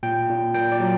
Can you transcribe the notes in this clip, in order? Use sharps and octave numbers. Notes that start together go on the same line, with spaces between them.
A#2 G5
A#2
A#2 G5
D5
F#3